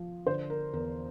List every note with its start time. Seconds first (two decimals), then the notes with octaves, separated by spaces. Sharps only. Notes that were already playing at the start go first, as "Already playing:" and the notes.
Already playing: F3
0.26 D3 C5
0.50 A#4
0.73 E2 A#4